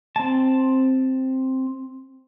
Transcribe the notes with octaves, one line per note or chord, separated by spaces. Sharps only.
C4 A5